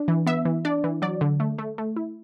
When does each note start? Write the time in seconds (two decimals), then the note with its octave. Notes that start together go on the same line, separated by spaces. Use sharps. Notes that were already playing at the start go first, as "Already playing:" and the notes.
Already playing: D4
0.08 E3
0.26 B3 E5
0.45 E3
0.65 D4 D5
0.84 E3
1.02 F#3 D5
1.21 D3
1.40 A3
1.58 A3
1.78 A3
1.96 E4